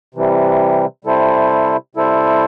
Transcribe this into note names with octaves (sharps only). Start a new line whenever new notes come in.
C3 E3 G3
C3 G3 E4 A4 C5
C3 G3 E4 A4 C5